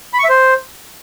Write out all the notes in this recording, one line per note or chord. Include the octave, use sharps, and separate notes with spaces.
B5
C#6
E5
C5